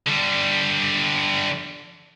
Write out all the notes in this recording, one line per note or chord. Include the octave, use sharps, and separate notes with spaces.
D3 G3